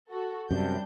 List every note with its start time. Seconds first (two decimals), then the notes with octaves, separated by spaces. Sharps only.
0.10 F#4 A4
0.51 F#2 C3 G3 D4 G6